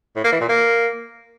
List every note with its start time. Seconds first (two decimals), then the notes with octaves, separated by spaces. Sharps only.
0.16 A2
0.24 A#3
0.32 E3
0.41 A#2
0.49 A#3